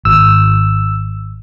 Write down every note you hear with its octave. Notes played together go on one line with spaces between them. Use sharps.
G#1 E6